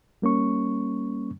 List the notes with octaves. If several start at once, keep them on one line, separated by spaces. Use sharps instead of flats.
G3 A#3 C#4 C#6